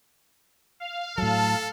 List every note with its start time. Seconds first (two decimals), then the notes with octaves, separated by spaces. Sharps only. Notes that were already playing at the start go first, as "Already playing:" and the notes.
0.80 F5
1.18 A2 F#3 A4 A5